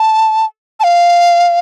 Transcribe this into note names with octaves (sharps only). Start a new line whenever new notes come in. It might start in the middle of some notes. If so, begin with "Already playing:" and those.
Already playing: A5
A5
F5